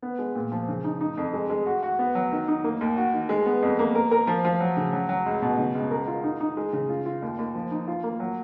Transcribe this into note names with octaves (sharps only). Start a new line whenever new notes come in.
B3
G#3
A#2
F3
C#3
D#4
D#4
F2
G#3
G#3
F#4
F#4
B3
F#3
D#3
D#4
A#3
D#2
F#4
D#3
G#3
B3
F2
A#3
A#4
A#4
F3
F3
F#3
C#3
F#3
F#3
C#2
B2
C#3
C#2
A#4
F4
D#4
D#4
G#3
C#3
F4
F4
D#2
D#2
F3
D#4
F4
A#3
F#3